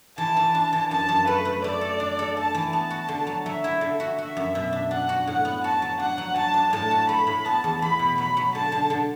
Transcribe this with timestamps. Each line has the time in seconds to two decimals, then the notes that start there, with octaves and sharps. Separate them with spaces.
0.18 E3 A5
0.37 E3
0.55 D4
0.73 E3
0.91 F#2 A5
1.09 F#2
1.27 A3 B4
1.45 A3
1.64 A3 D5
1.81 A4
2.00 D4
2.19 A4
2.37 A4 A5
2.55 E3
2.73 B3 A5
2.90 F#4
3.08 D3
3.27 F#3
3.45 F#3 E5
3.64 E4
3.81 D3
4.00 F#4
4.18 F#4 E5
4.37 F#2
4.55 B2
4.73 D4
4.91 D4 F#5
5.09 F#4
5.27 A2 F#5
5.45 B3
5.64 F#4 A5
5.82 F#3
5.99 D4 F#5
6.18 F#3
6.36 F#3 A5
6.54 D4
6.73 A2 A5
6.91 F#4
7.09 A3 B5
7.27 A2
7.45 B3 A5
7.64 E2
7.82 E2 B5
7.99 B2
8.18 F#3 B5
8.37 F#3
8.55 D3 A5
8.72 D3
8.90 D3